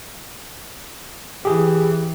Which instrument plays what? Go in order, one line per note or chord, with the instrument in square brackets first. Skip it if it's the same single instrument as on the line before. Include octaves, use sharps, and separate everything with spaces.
[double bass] E3 [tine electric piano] G4 G#4